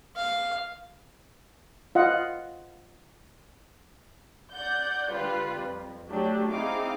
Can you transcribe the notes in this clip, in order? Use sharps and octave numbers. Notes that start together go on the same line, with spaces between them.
F5
F4 D#5 F5 F#5
D5 F#5 G6
D3 G3 F4 B4
F2
F#3 A3 D4 G4
C4 D#4 E4 G#4 F5 D6